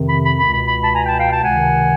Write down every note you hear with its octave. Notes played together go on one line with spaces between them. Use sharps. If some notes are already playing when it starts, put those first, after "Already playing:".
Already playing: F2 C3 D#3
B5
B5
B5
C#2 B2
B5
B5
A5 B5
G#5 A#5
G5 A5
F5 G5
G5 A5
C#2 C3 D#3 F#5 G#5